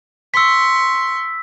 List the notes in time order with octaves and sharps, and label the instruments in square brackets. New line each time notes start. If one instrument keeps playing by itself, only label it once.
[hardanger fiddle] C6 C#6 [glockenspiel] E6 B6